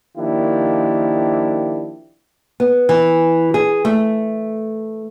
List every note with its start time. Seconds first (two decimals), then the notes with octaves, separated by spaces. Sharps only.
0.18 D#3 F3 A#3 D4 E4 G4
2.60 B3
2.89 E3
3.54 G#4
3.85 A3